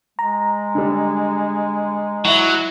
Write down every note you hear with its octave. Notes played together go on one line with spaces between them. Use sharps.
G#3 A#5
D3 G3
F#3 E4 E5